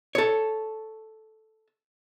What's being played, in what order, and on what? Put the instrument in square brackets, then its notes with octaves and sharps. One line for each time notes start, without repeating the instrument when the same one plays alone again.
[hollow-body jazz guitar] A4 C#5